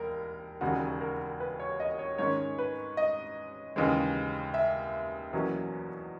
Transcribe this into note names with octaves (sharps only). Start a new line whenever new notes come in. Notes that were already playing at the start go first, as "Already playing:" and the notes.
Already playing: E1 D#2 A#4
E1 D#2 C#3 F#4
A#4
B4
C#5
D#5
C#5
G#2 D#3 G#3 C#4 C#5
B4
D#5
D#2 C#3 E3 G#3
E5
E2 B2 F#3 A#3 C#4